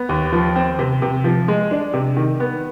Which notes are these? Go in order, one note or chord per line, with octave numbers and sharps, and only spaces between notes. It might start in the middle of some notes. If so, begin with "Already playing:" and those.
Already playing: B3
D#2
F3
C4
C3
C3
F3
G#3
D4
C3
D#3
B3